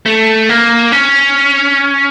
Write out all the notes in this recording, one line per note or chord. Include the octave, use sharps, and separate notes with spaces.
A3
A#3
C#4